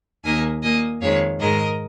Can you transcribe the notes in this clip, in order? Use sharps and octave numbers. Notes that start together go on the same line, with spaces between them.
D#2 D#3 A#3 D#5 G#5
A#2 A#3 D#5 G#5
F2 D#3 G#3 C#5 F5
G#2 D#3 G#3 A#4 D#5